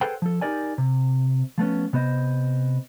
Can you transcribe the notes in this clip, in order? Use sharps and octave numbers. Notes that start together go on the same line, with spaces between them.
G#4 A4 B4 C5 F#5 G5
F3 A4
D#4 F#4 G4 A#4 D5 G#5
C3
F3 A3 B3 C#4
C3 B3 C5 D#5